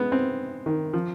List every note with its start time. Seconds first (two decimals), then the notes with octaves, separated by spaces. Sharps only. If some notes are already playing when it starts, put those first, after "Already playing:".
Already playing: G#3 B3
0.12 C4
0.66 D#3
0.93 F3